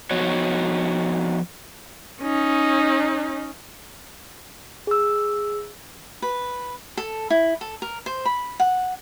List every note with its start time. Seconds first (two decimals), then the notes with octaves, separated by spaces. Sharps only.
0.11 F3 B3 D#4 F#4 C#5
2.22 C#4 D#4
4.87 G#4 E6
6.22 B4
6.97 A4
7.30 E4
7.61 A4
7.82 A#4
8.06 C5
8.25 B5
8.59 F#5